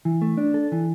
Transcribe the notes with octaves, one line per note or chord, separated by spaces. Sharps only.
E3
A3
D4
A4
E3